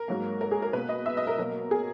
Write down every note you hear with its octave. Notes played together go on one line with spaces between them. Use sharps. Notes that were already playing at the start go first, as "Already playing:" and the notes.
Already playing: A#4
G#2 F#3 A#3
A#4
G#4
A#4
B2 A#3 B4
D#5
E5
D#5
A#4
B2 F#3 A#3 A#4
G#4